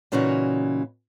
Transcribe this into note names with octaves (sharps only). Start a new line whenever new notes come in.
A#2 C#3 E3 C#4 D#4 F#4